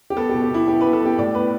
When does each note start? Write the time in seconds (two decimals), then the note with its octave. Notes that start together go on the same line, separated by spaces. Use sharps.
0.10 G4
0.17 B3 A4
0.30 G4
0.34 B2
0.42 G4
0.51 B2 E4
0.68 B3 G4
0.81 B2 B4
0.93 A4
1.02 B3 G4
1.18 A2 D5
1.34 B3 B4